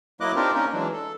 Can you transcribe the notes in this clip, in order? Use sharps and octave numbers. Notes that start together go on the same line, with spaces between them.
F#3 A#3 E4 D#5 D6 F#6
C4 D4 D#4 F4 G4 A#4
A#3 C#4 D#4 A#4
E3 F#3 G#3 D4
A4